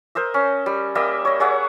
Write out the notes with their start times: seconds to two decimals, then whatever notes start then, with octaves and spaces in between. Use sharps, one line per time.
0.15 A#4 C5 D#5 E5
0.34 C#4
0.66 G3
0.95 G3 A#3 D#5 E5
1.25 C#5 D#5
1.40 G#4 C#5 E5 F#5